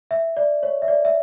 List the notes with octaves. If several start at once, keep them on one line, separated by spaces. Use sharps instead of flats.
E5
D5
C#5
E5
D5
E5